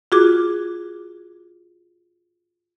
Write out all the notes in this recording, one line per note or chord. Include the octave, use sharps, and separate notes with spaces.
F4 F#4 G#4 D6